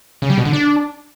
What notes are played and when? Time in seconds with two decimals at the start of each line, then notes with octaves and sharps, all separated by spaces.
0.22 C#3
0.30 G3
0.38 B2
0.45 D3
0.53 D4